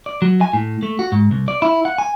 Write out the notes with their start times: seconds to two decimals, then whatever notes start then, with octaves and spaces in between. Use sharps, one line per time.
0.06 D5
0.22 F#3
0.41 G#5
0.53 A2
0.83 A3
0.99 F#4
1.12 G#2
1.31 C2
1.48 D5
1.62 E4
1.85 F#5
1.98 G#5